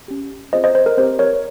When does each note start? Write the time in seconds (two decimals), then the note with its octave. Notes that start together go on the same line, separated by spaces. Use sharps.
0.08 C#4 G4
0.53 C4 F4 G#4 C5 D#5
0.64 C5 D#5
0.75 C5
0.86 A#4
0.97 C4 G4 C5
1.19 A#4 C#5